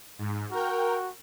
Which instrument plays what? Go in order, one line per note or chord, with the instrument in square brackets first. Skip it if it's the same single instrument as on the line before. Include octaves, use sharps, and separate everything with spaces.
[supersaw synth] G#2
[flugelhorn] F#4 [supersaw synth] A#4 G5